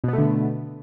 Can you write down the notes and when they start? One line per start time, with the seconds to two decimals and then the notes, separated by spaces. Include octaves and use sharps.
0.04 B2
0.08 B3
0.13 A3
0.18 D3